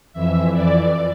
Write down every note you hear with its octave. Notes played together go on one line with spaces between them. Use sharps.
F2 E3 E5
D5